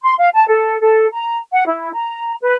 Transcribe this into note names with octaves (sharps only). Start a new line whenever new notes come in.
C6
F5
A5
A4
A4
A#5
F#5
E4
A#5
B4